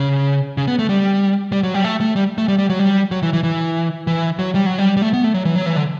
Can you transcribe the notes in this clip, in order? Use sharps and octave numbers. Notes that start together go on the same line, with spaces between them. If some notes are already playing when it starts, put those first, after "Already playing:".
Already playing: C#3
C#3
B3
A3
G3
G3
F#3
G3
A3
A3
G3
A3
G3
G3
F#3
G3
F#3
E3
E3
E3
E3
F#3
G3
F#3
G3
G3
A3
B3
A3
F#3
E3
F#3
E3
D3